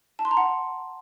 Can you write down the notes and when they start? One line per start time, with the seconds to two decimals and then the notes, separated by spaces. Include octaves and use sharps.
0.19 A5
0.25 C6
0.31 A#5
0.37 F#5